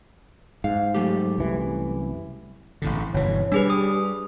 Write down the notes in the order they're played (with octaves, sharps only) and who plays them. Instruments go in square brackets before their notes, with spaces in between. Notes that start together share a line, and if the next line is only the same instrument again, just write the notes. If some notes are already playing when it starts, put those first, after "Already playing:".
[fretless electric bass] G#2 [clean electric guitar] F5
[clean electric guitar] F#3 A3 G4
[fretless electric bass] C2 F#2 E3
[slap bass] A1 A2 D3
[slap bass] G1 B2 E3 [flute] C#5
[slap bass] G3 [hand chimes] D4 G#4 B4 [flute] G4
[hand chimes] D#6